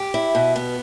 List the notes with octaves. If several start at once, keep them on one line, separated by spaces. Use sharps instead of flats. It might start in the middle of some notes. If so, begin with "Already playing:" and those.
Already playing: G4
E4
B2
B3